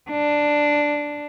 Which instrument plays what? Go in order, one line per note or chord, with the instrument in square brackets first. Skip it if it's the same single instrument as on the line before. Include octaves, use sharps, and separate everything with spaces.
[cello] D4